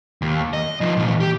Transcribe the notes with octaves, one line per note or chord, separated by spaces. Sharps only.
D#2
D#5
F3 D#4
A#2 E3
G4